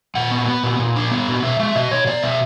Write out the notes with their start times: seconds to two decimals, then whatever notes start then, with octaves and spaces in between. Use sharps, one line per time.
0.15 A#2 F#5
0.31 B3
0.48 B3
0.63 A#2
0.79 A#2
0.96 D4
1.11 B3
1.28 A#2
1.43 B2 E5
1.59 G#3 E5
1.75 B2 D#5
1.91 B2 C#5
2.07 B3 D5
2.23 B2 E5